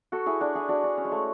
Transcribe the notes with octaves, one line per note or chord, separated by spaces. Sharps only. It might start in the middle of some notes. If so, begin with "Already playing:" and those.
F#4 A4
E4 G#4
D4 F#4
E4 G#4
D4 F#4
D4
C#4
G#3
A3